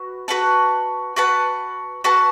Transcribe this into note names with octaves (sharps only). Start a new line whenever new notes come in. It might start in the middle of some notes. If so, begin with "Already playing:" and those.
Already playing: F#4 B4
F#4 B4 F#5 A5
F#4 B4 F#5 A5
F#4 B4 F#5 A5